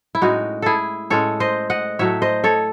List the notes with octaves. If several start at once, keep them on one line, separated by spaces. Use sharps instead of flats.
E4
A2 G#3 C#4 D#4 F#4
E4 G#4 A4
A2 G#3 C#4 A4 C#5
C5 D#5
D#5 F#5
A2 F#3 A3 C#5 E5
C5 D#5
A4 C#5